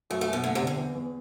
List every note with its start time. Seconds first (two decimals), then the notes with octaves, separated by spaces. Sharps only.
0.10 F#2 A3
0.21 A3
0.27 F#2
0.33 B2
0.44 D3 A3
0.55 C3
0.61 D3
0.67 C3
0.77 E2
0.95 E2